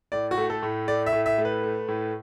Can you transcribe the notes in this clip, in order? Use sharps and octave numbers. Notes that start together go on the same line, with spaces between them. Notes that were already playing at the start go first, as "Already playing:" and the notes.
A2 D5
F#4
A3
A4
A2
A3 D5
E5
A2
E5
A3
B4
A3
A2